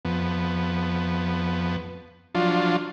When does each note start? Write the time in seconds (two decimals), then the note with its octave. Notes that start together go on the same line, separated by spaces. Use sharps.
0.05 F2 B3
2.35 F3 F#3 D4 F4